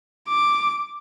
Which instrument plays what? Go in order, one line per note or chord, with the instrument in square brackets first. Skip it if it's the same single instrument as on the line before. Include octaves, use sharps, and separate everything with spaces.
[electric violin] D6